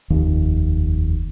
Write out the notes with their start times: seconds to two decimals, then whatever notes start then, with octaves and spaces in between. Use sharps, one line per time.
0.10 F1 D#2